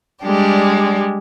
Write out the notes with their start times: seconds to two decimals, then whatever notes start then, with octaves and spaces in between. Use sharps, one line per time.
0.23 G3 G#3 D4 G4